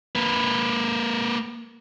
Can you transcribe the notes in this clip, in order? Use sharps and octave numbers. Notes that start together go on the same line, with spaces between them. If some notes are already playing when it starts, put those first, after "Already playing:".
A#3 B4